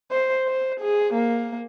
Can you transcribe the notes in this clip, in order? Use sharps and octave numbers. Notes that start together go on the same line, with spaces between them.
C5
C5
G#4
A#3